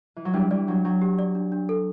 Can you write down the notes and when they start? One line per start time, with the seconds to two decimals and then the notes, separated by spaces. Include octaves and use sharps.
0.16 E3
0.25 F#3
0.34 E3 G3 D4
0.51 E3 G3 D5
0.68 F#3 D4
0.84 F#3 D4
1.02 G4
1.19 D5
1.35 D4
1.52 D4
1.69 A4